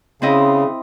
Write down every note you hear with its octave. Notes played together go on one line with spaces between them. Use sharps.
C#3 C4 E4 D#5